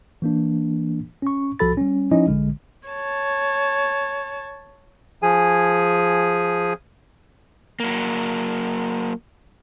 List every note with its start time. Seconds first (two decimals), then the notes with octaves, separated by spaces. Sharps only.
0.22 E3 A#3 D4
1.22 C#4 C#6
1.59 C2 F3 F#4 A4 B5 A6
1.77 G3 C#4
2.11 F3 C#4 D#4 E4 D#5
2.28 A#1 D3 G#3
2.88 C#5 A5
5.22 F3 G#4 G#5
7.80 F#3 A#3